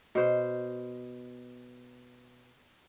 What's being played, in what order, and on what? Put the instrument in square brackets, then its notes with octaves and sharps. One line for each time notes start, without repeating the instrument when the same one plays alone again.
[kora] B2 C5